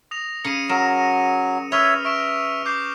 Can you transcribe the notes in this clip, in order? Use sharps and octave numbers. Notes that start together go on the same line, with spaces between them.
D#6 A#6 F7
C#3 C#7 D#7
F#3 A#4 E7
B4 C#5 E5 D#6 F6 F7
E5 C#6 D7 E7
D6 G6 C7